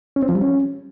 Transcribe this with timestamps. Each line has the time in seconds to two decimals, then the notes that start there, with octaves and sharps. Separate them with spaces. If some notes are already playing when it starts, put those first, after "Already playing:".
0.16 C#4
0.23 C4
0.29 F3
0.35 G3
0.41 C#4